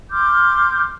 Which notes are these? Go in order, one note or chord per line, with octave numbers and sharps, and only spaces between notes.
C6 D6 F6 G6